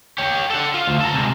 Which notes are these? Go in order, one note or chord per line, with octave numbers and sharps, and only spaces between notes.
G4 C#5
A4 F#5
F4
D2
A4 A#4
C3 G#3